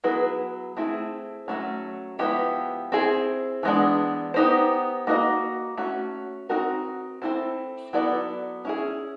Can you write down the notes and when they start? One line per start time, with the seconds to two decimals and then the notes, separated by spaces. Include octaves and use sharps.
0.04 F#3 B3 E4 G#4 B4
0.77 A3 C4 E4 G#4
1.48 F#3 A3 C#4
2.19 F3 G#3 B3 E4 G4
2.92 C4 E4 G#4
3.63 E3 G#3 B3 D4
4.34 B3 D#4 G4 C5
5.07 A#3 D#4 F#4 A#4 D#5
5.77 A3 C#4 F#4
6.49 C4 D#4 F#4 A#4
7.22 C4 E4 A4 C5
7.93 F#3 B3 E4 A4 D5
8.65 C#4 E4 G#4